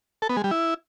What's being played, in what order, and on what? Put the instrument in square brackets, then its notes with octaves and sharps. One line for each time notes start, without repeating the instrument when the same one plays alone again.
[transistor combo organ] A4
B3
G#3
G3
E4